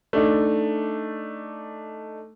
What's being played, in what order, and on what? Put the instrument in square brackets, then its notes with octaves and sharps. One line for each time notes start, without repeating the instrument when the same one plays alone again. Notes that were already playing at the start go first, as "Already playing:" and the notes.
[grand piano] A3 D4 D#4